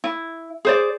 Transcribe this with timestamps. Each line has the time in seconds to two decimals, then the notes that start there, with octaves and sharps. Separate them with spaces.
0.04 E4
0.65 G#4 C5 D5